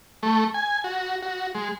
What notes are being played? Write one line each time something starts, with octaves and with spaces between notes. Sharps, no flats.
A3
G#5
F#4
F#4
G#3